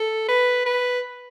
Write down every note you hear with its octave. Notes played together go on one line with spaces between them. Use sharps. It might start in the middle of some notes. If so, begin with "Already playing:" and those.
Already playing: A4
B4
B4